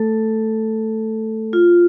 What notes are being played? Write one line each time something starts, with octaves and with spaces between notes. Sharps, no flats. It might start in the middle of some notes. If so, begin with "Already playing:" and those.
Already playing: A3 A4
F4